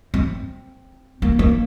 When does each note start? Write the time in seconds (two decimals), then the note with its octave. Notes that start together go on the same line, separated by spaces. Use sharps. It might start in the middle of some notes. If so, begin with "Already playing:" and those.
0.14 C4
1.22 A#3
1.39 A#3